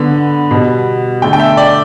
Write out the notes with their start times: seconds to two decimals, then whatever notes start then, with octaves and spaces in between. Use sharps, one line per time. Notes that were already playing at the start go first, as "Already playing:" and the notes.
Already playing: D3 B3 B5
0.51 B2 G3 B3
1.22 D3 A3 G5
1.33 G5
1.40 E5
1.57 D5